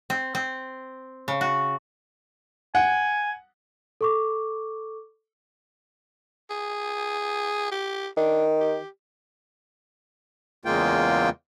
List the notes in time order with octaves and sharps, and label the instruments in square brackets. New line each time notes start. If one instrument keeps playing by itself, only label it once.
[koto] C4
C4
C#3
F#4
[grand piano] F#5 [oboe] G#5
[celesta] A4 C#6 D6
[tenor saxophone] G#4
G4
[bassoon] D#3 [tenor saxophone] D4
[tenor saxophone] G4
[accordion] E2 C#3 G#3 A#3 F4 G5